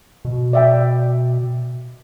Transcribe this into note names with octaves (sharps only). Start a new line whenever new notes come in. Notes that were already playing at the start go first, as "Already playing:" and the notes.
B2
D5 E5 G5